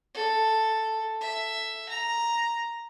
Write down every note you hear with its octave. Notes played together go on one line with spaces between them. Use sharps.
A4
E5
A#5